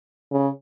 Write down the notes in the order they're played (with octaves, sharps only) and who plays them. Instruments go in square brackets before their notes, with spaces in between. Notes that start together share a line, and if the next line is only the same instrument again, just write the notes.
[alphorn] C#3